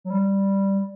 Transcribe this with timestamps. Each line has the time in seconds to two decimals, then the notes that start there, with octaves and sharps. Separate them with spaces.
0.05 F#3
0.10 G3